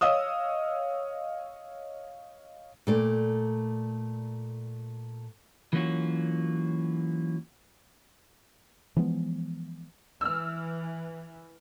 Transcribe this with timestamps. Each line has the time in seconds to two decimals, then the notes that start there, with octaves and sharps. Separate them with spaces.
0.01 C#5 D#5 F5 D#6 E6
2.87 A#2 A3 D5
5.73 E3 F#3 A#3 C#4 F4 F#4
8.96 E3 F3 G#3 B3
10.21 E3 E6 F6